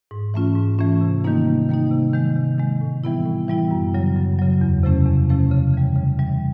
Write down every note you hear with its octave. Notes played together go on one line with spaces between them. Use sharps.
G#2
E3 A3 C#4 F4
G#2
E3 A3 C#4 F4
C3
D#3 G3 A#3 D#4
C3
D#3 G3 A#3 D#4
C3
D#3 G#3
C3
D#3 G#3
A2
E3 G3 B3 E4
A2
E3 G3 B3 E4
F#2
C#3 F#3
F#2
C#3 F#3
E2
C3 F3 A3 C#4
E2
C3 F3 A3 C#4
C#3
E3 G3
C#3
E3 G3